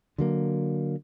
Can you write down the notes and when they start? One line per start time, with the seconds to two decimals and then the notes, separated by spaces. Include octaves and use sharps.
0.18 D3 F#3 A#3